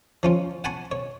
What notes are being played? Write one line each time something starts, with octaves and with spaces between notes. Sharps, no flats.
F3 C#4 F4
F#5 G#5 A5 B5 C#6
C#5